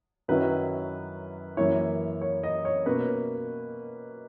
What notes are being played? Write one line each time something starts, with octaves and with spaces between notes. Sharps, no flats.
F#2 D#3 F#3 C#4 E4 B4
F#2 E3 A#3 E4 C#5
C#5
D#5
C#5
B2 A#3 C#4 B4